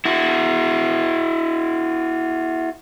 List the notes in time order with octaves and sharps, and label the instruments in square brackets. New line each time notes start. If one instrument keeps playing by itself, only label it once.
[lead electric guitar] E4 F#4